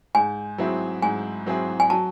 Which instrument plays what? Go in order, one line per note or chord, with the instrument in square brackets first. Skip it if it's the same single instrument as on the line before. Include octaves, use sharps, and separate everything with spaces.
[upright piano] G#2 [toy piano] G#5
[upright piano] F#3 C4 E4 G#4
[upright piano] G#2 [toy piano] G#5
[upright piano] F#3 C4 E4 G#4
[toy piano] G#5
[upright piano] F#3 [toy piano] A5